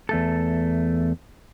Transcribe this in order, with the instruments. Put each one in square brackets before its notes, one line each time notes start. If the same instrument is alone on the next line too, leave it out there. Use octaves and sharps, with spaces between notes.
[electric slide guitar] E2 A3 A4